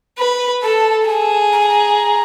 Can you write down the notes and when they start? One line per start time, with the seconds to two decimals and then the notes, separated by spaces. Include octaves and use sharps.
0.18 B4 B5
0.63 A4 A5
1.04 A#5
1.08 G#4 A5
1.52 A#5
1.61 A5
1.69 A#5